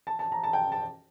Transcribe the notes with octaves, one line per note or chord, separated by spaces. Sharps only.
A5
A5
A#5
A5
G5
A5